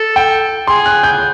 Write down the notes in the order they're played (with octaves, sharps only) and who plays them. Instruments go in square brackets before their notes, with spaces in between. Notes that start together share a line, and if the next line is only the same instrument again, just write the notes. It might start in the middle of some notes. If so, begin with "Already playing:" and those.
Already playing: [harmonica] A4
[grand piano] G5
[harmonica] G#4 [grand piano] C6
[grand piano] F#6
G6